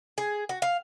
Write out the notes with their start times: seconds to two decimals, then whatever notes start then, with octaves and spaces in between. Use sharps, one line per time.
0.18 G#4
0.49 F#4
0.62 F5